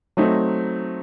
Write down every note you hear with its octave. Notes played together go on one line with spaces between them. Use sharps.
F#3 A3 C4 D#4